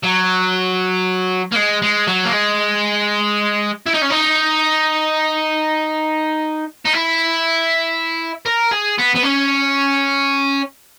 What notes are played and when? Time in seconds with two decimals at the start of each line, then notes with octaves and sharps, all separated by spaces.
0.03 F#3
1.52 A#3
1.56 G#3
1.82 G#3
2.07 F#3
2.25 A#3
2.32 G#3
3.87 E4
3.94 D#4
4.02 C#4
4.10 D#4
6.86 D#4
6.94 E4
8.46 A#4
8.71 G#4
8.98 B3
9.15 B3
9.23 C#4